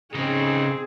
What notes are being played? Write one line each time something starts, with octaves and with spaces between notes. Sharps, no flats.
C#3 C4 D#4 G#4